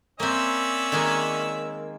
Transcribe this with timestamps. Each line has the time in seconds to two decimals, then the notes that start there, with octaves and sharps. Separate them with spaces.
0.20 A#3 C4 C#4 D5 E5
0.92 D#3 G#3 A#3